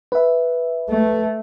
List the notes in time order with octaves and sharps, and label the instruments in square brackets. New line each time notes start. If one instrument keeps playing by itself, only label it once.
[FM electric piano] B4 E5
[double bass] A3